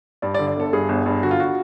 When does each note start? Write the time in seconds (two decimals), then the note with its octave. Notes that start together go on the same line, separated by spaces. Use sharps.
0.22 G2 D5
0.35 D5
0.39 D3
0.48 D5
0.56 G1 A4
0.73 G2 G#4
0.89 G1
1.06 G2
1.22 D3 F#4
1.31 F4
1.40 F#4